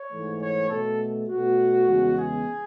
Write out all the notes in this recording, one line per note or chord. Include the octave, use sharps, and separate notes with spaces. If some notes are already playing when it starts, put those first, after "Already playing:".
Already playing: C#5
G#2 E3 A3
C#5
B2 A3 A4
B2 A3 F#4
E2 C#3 G#3 B3
G#4